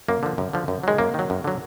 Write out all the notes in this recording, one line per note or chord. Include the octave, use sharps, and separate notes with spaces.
F#2 A#3
D3 F3
F#2
D3 F3
F#2
D#3 F#3 G#3
F#2 A#3
D#3 F#3
F#2
D3 F#3